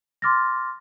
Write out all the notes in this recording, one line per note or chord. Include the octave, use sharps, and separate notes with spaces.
C6 D6 F6 A6 A#6